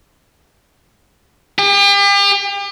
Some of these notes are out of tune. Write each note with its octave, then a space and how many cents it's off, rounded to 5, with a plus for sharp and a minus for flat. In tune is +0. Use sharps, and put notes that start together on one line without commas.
G4 +40